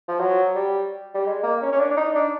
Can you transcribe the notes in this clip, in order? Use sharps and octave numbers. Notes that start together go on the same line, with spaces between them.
F3
F#3
G3
G3
G#3
A#3
C#4
C#4
D4
D4
D#4
D4